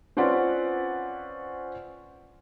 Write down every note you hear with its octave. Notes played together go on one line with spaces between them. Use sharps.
C4 C#4 F4 B4 D5 F#5